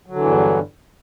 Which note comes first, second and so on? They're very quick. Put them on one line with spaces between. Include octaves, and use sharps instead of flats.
F#3 D3 E3 E2 G2